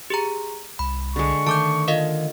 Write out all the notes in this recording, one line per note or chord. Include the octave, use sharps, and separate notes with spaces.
G4 G#4 A#5
C2 B5
D3 G#3 C#6
D#3 A3 A5 D6 G6
F4 A#4 D#5 F5